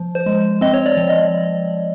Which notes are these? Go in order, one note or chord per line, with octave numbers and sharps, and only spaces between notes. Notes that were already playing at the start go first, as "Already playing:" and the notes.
Already playing: F3
C5
G#3
C4 D#5
C#5
D5
F3
D#5